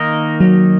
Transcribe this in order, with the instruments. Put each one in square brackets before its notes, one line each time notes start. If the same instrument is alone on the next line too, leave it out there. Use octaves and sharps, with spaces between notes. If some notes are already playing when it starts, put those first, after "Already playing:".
Already playing: [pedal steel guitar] D#3 A#3 D#4 A#4 D#5
[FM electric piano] F#3